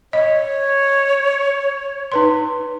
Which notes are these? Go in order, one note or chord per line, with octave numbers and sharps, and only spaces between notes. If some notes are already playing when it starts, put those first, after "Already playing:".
C#5 D#5
D#4 B4 C6